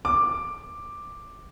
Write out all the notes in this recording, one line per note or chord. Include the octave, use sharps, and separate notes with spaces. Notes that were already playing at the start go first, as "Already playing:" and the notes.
D6